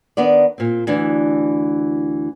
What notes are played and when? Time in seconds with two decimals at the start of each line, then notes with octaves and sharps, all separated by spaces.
0.17 D#3 B3 D4 D5
0.58 A#2 C4
0.87 D2 E3 D4